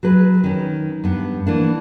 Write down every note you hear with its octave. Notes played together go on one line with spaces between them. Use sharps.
F#3 G#4 B4
D#3 C#4
G2 B3
E3 A#3 D4